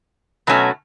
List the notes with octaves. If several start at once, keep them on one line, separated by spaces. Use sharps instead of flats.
B2 F#3 A3 C#4 F#4